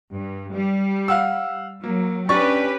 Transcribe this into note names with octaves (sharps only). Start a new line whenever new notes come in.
G2
G3
F5 F#5 E6
F#3 A#3
C#4 D4 G4 B4 C#6 A6